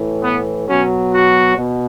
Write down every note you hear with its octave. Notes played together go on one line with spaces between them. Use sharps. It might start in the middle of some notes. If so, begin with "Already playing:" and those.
Already playing: A2 E3
B3
B2 F#3 C#4
F#4
B2